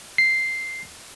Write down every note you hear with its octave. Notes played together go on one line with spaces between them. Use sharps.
C7